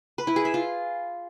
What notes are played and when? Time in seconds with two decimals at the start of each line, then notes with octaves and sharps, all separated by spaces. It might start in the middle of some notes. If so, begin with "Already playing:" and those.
0.18 B4
0.27 E4
0.36 G#4
0.45 E5
0.54 F4